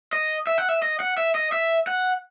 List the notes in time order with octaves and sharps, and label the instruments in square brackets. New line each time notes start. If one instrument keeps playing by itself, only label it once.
[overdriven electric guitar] D#5
E5
F#5
E5
D#5
F#5
E5
D#5
E5
F#5